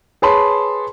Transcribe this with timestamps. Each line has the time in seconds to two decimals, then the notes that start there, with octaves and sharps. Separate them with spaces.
0.22 G#4 B4 C#5 A5 B5 C6